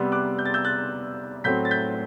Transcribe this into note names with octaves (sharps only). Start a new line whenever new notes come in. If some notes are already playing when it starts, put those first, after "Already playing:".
Already playing: C3 G3 B3 C6 E6
D6 F#6
G6
A6
E6 G6
F#6 A6
A2 F#3 A3 C4 G6 B6
A6
G6 B6